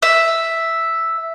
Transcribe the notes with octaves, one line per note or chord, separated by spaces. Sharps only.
E5